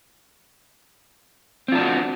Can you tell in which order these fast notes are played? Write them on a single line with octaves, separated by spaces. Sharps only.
C4 F4 D4 F#4